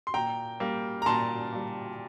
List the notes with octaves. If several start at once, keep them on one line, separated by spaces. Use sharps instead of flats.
C6
A#2 G5 A#5
G3 A#3
A#5
A#2 A5 C6
G3 A#3